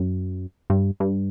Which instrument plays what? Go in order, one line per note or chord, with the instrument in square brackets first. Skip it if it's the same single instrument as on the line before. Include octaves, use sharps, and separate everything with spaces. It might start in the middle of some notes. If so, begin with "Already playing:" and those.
Already playing: [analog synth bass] F#2
G2
G2